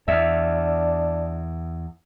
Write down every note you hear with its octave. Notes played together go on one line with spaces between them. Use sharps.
E2 D4 E5 F6